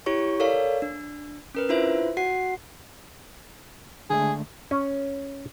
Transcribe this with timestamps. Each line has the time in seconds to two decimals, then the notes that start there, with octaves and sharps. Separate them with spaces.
0.06 E4 G4 C#5 C#6
0.40 A4 A#4 C#5 D5 F5
0.82 D4
1.55 C#4 A#4 B4
1.69 D4 E4 F4 B4 C5 E5
2.17 F#4 F#5 C7
4.10 D3 G#3 A3 G#4
4.71 C#4